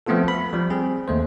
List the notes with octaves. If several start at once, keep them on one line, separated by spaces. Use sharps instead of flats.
F3 A3 B3 C4 F4 A4
B5
F3 G3
C4 G#4
D#2 A3 C5